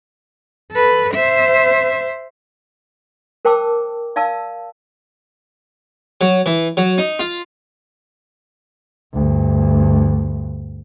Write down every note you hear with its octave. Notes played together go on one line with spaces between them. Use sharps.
A4 B4
C5 E5
A#4 C5 G5 A5 D6 E6
D5 F5 A5 E6
F#3
E3
F#3
D#4
F4
D2 G2